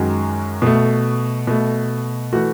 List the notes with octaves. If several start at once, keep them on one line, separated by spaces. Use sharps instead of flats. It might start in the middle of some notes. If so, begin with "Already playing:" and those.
Already playing: F#2 D#3 G#3 F#4
B2 A3
B2 A3
E3 A3 F#4